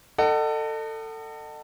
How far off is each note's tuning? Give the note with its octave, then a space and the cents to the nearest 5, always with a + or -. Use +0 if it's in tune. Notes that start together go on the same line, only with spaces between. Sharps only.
A4 +20 D#5 -30 F#5 +25